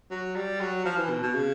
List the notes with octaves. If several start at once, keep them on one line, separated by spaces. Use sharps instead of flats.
F#3
G3
F#3
F3
E3
B2
B2
C#3